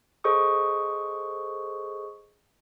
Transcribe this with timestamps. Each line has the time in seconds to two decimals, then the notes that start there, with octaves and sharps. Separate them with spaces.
0.24 G#4 A4 C5 D#5 C#6 D#6